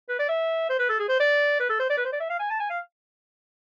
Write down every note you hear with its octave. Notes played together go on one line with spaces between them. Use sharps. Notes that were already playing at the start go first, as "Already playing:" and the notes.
B4
D5
E5
C5
B4
A4
G#4
C5
D5
B4
A4
C5
D5
B4
C5
D5
E5
F5
G#5
A5
G#5
F5